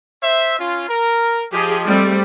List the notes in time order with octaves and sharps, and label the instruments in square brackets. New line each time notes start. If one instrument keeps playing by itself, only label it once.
[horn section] C5 E5
C#4 F4
A#4
[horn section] F3 [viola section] G4 G#4 D#5
[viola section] G3 A3 C4